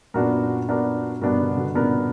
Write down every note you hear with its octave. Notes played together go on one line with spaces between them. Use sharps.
F#2 A#2 B3 D4 F#4 A#4
B3 D4 F#4 A#4
G2 B2 B3 D4 F#4 A#4
B2 D3
B2 D3
A#2 C#3 B3 D4 F#4 A#4